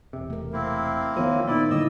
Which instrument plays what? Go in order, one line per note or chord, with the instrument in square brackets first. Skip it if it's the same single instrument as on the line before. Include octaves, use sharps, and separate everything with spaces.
[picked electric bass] E1 C3
[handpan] A3 A#4
[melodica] A#3 C4 E4
[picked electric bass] D#3 F3 [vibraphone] B3 C#5 F5 [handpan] A#4 C5
[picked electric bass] A#2 D#3 [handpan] A#3 [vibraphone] D#4 [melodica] E4 D5
[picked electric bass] A2 [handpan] D3 G3 A#3 [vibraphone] E4 [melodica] D#5 E6